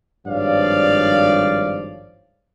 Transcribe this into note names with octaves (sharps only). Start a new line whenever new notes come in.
G#1 G2 F3 C#5 D5 F5